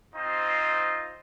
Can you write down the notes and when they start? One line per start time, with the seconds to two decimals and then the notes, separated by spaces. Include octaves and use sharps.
0.15 C4 D#4 F4 C5